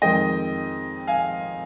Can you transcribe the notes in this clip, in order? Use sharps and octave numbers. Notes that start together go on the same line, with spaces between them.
F2 D#3 G#3 D#5 G5
F5 G#5